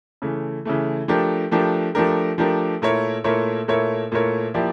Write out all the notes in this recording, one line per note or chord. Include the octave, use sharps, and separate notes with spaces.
C#3 E3 A3
C#3 E3 A3
F3 A3 D4 G4 A#4
F3 A3 D4 G4 A#4
F3 A3 D4 G4 A#4
F3 A3 D4 G4 A#4
A#2 A3 E4 A#4 C#5
A#2 A3 E4 A#4 C#5
A#2 A3 E4 A#4 C#5
A#2 A3 E4 A#4 C#5
F3 A#3 E4 G4 D5